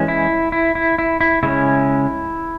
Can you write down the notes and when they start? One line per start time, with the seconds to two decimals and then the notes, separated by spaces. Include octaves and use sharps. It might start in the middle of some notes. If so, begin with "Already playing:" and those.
Already playing: E3 G#3 C#4
0.08 E4
0.52 E4
0.75 E4
0.98 E4
1.21 E4
1.43 C#3 G#3 C#4 E4